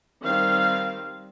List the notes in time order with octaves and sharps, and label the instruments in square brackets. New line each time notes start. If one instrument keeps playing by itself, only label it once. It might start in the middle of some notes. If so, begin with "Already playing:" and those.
[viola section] D#3 G3 C4 F5